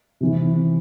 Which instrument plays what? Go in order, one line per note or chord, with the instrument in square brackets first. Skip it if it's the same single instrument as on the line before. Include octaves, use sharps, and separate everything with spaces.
[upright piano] C3 E3